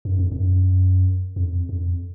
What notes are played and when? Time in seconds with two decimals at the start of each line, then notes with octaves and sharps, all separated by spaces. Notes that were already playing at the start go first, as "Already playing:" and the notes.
0.05 F#2
0.19 F2
0.32 F#2
1.36 F2
1.69 F2